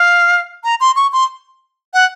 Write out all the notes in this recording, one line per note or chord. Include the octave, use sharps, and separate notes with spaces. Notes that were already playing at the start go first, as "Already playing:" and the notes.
Already playing: F5
A#5
C6
C#6
C6
F#5